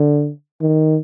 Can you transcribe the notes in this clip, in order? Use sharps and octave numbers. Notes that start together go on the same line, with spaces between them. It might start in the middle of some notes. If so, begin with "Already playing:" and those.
Already playing: D3
D#3